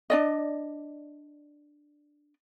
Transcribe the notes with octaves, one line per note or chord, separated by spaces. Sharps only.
D4 D5 D#5